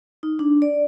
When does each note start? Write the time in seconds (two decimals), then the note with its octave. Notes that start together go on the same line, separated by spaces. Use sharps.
0.23 D#4
0.39 D4
0.62 D5